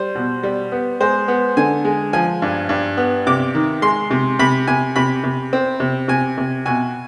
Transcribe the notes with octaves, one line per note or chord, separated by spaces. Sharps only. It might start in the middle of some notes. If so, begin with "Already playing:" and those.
Already playing: G3 C5
B2
G3
B3
G#3 C5
B3
D3 G#5
G#3
F3 G#5
G2
G2
B3
C3 D6
D#3
G#3 C6
C3
C3 B5
C3 G#5
C3 B5
C3
C4
C3
C3 G#5
C3
B2 G#5